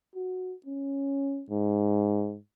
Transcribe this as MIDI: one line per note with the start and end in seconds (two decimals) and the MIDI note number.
0.15 0.54 66
0.66 1.44 61
1.50 2.37 44